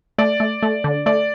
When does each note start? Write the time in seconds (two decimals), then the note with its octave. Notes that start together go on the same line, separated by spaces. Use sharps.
0.18 A3 D5
0.40 A3
0.63 A3
0.84 D3
1.06 A3 D5